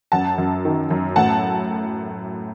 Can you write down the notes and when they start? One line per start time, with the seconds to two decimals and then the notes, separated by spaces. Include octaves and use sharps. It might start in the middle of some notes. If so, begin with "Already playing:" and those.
0.12 F#2 F#5 A5
0.38 F#2
0.65 D#3
0.90 F#2
1.16 A2 F#5 A5